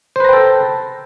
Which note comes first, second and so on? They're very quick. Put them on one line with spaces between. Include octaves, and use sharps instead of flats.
C5 B4 A#5 G5 A4